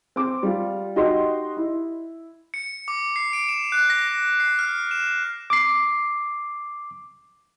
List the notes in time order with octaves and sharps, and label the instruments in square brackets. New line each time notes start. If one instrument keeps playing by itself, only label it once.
[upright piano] C4 D6
G3 F4
D#4 F#4 G4 D#5 C6
E4
[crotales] C#7
D6
C7
D7
E7
F#6
A#6
C7
F6
E7
[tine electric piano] D6 C7